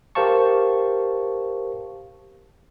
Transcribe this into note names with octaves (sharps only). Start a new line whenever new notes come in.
G4 A#4 C5 F5 A5 C#6